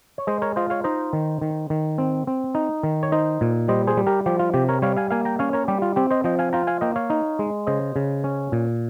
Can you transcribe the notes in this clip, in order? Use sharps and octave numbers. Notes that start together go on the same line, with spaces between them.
C#5
G#3 C5 D#5
A#4 C#5
F4 C5 D#5
C#5 F5
D#4 C5 D#5
D#3
D#3
D#3
C4
C4
D#4
D#3
C#5
D#4 C5 D#5
A#2
G3 C5 D#5
G#4 C5
G3
G4 A#4
F3 G4
F4
C3 G4
A#4 C#5
G3 C#5 F5
F5 G#5
A#3 F5 G#5
G5 A#5
C#4 C#5 F5
A#4 C#5
G3 G4
F4
C4 G4
C5 D#5
F3 D#5 G5
F5 G#5
F4 G5 A#5
F5 G#5
A#3 D#5 G5
C#5 F5
D#4
G#3
C#3 C5 D#5
C#3
C#4
A#2